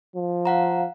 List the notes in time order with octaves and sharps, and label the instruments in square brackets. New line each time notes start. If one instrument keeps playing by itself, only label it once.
[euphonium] F3
[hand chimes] F5 F#5 A#5